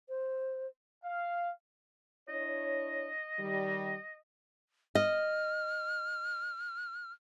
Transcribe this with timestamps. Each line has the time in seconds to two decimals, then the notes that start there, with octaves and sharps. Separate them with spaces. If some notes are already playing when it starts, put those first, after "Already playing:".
0.09 C5
1.04 F5
2.29 D4 E4 C#5 D#5
3.39 D#3 G3
4.95 D#5 F6